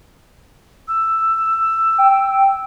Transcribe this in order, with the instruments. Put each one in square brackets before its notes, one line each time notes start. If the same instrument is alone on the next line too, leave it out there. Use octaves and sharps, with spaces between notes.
[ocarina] E6
[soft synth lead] G5